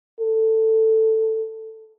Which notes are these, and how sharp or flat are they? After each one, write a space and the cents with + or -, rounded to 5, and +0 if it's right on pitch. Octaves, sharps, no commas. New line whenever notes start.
A4 +10